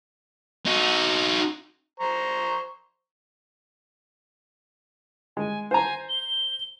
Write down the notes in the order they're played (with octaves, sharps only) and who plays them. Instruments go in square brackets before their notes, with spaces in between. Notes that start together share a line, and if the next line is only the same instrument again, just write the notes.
[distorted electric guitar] D#4 F#4
[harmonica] C5 A#5 C#6
[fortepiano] G#3 [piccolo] G#5
[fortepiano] C5 A#5 [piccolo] G#5
[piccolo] G7